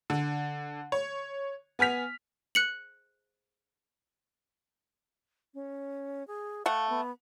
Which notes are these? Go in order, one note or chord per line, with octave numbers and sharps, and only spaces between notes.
D3
C#5
B3 G#5 F6 B6 F7
F#6 C#7 F#7
C#4
G#4
A3 F5 F#5
B3